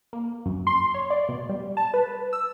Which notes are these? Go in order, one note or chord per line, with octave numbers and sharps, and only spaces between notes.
A#3
F#2
C6
C#5
D5
B2
G3
A5
B4
E6